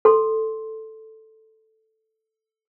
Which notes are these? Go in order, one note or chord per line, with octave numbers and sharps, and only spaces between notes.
A4 C6